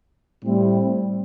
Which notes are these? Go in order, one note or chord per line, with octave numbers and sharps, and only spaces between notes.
A2 G3 C4 E4